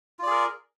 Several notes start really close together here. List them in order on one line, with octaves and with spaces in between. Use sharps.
F4 D5 G#4 A#4